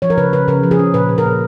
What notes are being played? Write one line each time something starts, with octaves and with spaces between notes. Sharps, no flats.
F3 C#5
A#4
C#3 B4
C#3 B4
C#3 A#4
F3
G#4
C#4
A#2 B4
A#2
A#4
A#2